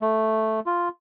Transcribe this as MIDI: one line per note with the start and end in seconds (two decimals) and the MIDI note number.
0.02 0.60 57
0.66 0.89 65